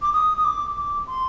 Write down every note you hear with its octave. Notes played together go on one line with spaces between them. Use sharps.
D6
D#6
D#6
D6
D6
C6